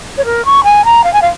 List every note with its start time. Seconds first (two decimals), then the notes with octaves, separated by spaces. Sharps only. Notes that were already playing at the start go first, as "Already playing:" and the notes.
0.17 C#5
0.25 A#4
0.45 C#6
0.64 G#5
0.85 A#5
1.04 F5
1.13 G#5
1.22 F5